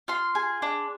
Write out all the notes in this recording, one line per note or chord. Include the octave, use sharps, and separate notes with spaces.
F4 C6
G#4
D4